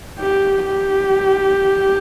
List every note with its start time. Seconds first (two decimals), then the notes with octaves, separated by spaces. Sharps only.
0.20 G4
0.65 G4